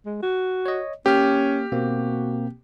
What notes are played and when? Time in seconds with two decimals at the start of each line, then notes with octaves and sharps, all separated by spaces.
0.06 G#3
0.23 F#4
0.66 C#5 D#5
1.06 A#3 C#4 G4 F6
1.72 B2 A#3 C4 F#4